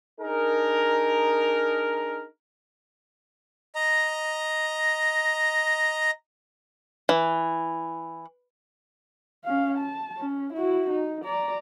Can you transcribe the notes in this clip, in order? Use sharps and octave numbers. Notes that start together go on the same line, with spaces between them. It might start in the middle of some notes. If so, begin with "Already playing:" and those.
D4 D#4 G#4 A#4
D#5 A#5
E3
C#4 F5
A5
C#4
E4 F#4
D#4
D5 A#5